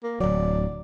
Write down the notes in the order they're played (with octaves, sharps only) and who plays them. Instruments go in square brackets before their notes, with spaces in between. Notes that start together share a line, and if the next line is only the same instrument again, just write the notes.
[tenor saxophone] A#3
[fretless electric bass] D1 F#3 [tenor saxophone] D5